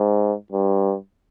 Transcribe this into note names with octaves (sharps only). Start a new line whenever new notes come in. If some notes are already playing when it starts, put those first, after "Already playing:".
Already playing: G#2
G2